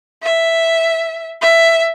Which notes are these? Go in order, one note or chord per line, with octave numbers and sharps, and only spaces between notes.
E5
E5